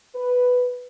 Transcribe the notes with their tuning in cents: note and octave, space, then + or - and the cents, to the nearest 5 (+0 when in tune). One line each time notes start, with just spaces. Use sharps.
B4 +5